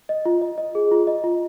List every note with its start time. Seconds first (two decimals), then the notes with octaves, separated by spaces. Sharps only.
0.09 D#5
0.26 F4
0.41 D#5
0.58 D#5
0.75 G#4
0.91 F4
1.07 D#5
1.24 F4